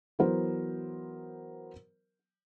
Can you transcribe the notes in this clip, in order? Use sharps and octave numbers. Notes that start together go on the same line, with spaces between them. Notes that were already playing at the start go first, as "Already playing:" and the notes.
E3 F#3 B3 A#4 C5